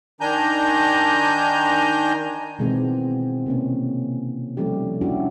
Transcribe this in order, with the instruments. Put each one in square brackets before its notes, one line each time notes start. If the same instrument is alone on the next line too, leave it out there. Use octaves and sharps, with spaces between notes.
[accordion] D#3 D4 G#5 A#5 G6
[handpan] B2 D#3 E3 G#3 B3 C4
C3 A#3 C#4
D#3 F3 G3 A3 C#4 G4
A3 C#4 D4 E4 F#4 G4